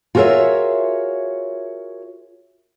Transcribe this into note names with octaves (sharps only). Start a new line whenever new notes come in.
F4 F#4 G#4 A#4 C#5 E5